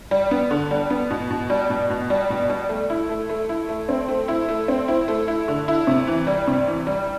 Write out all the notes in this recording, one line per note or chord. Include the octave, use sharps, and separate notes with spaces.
G3
B3
D3
G3
B3
B2
B2
G3
B2
B2
G3
B2
G3
A3
E4
A3
A3
E4
A3
C4
A3
E4
A3
C4
E4
A3
E4
D3
E4
C3
E3
G3
C3
E3
G3